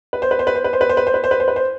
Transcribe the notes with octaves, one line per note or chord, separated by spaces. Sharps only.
B4
C5
B4
C5
B4
C5
B4
C5
B4
C5
B4
C5
B4
C5
B4
C5
B4
C5